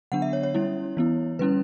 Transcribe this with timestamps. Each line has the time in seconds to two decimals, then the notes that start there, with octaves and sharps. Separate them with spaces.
0.12 D3 F#3 B3 D4 F#5
0.22 E5
0.33 C#5
0.43 C#5
0.54 G3 C#4 E4
0.97 E3 B3 E4
1.39 D3 G3 C#4 E4 B4